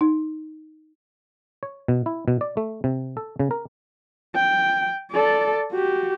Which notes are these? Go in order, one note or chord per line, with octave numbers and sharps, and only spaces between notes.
D#4
C#5
B2
E4
B2
D5
A3
C3
A4
C#3
A#4
G5
A4 D5
F#4 G4